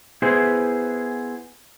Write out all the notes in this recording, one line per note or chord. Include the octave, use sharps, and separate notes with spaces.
B3 E4 G#4 C5